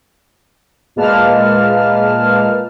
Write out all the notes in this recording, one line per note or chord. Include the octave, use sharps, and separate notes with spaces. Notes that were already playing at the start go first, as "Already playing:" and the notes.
A#2 G#3 A#3 B4 A5 F6